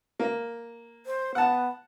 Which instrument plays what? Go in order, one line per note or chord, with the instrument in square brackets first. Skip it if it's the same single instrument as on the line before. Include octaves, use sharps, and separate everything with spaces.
[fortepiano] A#3
[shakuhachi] C5
[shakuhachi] B3 [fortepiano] F#5 A5